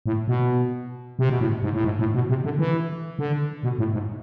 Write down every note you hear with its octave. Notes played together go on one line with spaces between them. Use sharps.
A2
B2
C3
B2
A2
G#2
A2
G#2
A2
B2
C3
D3
E3
D3
B2
A2
G#2